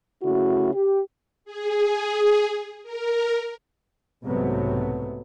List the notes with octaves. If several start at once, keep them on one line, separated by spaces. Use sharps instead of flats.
C#3 A3 E4 F#4
G4
G#4
A#4
B1 G#2 C3 F#3 A3 B3